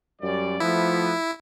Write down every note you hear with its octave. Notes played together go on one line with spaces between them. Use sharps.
F#2 G3 D5
F3 A3 B3 E4